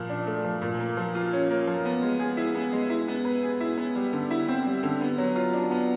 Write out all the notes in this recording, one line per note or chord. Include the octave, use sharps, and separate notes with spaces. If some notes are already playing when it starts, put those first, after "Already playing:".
Already playing: A#2 F3
D4
A3
F3
A#2
A#3
F3
F4
C#4
A#3
F3
B3
G#3
G#4
E4
B3
G#3
E4
B3
B4
G#4
E4
B3
G3
D3
E4
C4
G3
D3
B3
F#3
F4
D4
B3